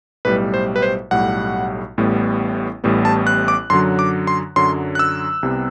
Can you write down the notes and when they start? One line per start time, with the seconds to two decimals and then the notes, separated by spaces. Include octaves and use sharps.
0.25 B1 A2 G3 B4
0.54 C5
0.76 B4
0.82 C5
1.11 B1 A2 G3 F#5
1.97 A1 A2 G3 B3
2.84 A1 A2 G3 B3
3.05 A5
3.27 F#6
3.48 D6
3.70 F#2 D3 F#3 C6
3.99 D6
4.27 C6
4.56 F#2 D3 F#3 C6
4.95 F#6
4.99 E6
5.43 C2 C3 G3 B3